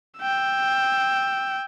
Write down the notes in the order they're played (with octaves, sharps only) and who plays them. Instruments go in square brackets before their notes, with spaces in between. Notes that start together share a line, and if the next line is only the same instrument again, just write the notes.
[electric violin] G5 E6